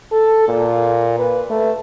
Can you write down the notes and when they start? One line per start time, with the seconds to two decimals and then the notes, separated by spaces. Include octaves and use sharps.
0.12 A4
0.48 A#2
1.19 B4
1.50 A3